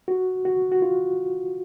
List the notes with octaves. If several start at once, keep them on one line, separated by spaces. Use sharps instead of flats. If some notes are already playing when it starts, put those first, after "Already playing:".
F#4
F#4
F#4
F4